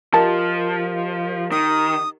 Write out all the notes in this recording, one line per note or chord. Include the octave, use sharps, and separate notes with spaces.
F3 G4 A#4 D#5 A5
D#3 D#6